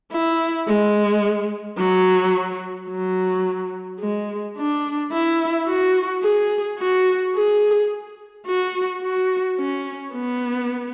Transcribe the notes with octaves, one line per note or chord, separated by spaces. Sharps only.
E4
G#3
F#3
F#3
G#3
D4
E4
F#4
G#4
F#4
G#4
F#4
F#4
C#4
B3